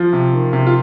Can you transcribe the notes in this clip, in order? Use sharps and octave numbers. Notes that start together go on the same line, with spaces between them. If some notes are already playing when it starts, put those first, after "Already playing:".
Already playing: F3 F4
C3
D#3
C3
F4